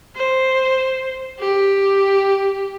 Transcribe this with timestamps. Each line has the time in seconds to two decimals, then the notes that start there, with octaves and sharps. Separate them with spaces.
0.16 C5
1.39 G4